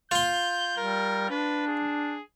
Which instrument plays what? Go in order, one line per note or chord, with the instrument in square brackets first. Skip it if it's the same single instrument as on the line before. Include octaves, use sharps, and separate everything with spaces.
[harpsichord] F4 C6 [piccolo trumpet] G6
[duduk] G3 [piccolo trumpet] A#4
[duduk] D4 [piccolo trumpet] B4
[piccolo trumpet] G#4